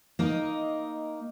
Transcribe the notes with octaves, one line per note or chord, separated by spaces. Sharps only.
A#3 D#4 A#4 D#5